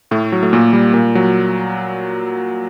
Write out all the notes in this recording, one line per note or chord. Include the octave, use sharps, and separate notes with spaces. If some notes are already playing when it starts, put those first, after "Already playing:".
A2 A3
F#3
A3
A#2 A#3
G3
A#2
F#3